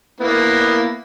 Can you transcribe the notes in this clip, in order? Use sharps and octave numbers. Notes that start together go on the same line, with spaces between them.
A#3 B3 E4